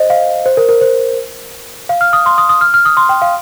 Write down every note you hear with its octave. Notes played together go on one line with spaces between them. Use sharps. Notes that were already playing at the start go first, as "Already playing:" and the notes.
Already playing: C5 D#5
F5
C5
A#4
A#4
C5
F5
F6
D#6
C6
D#6
D#6
F6
F6
D#6
C6
G5
F5